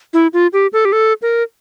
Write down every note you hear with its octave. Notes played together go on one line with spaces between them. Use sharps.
E4
F4
G4
A4
G4
A4
A#4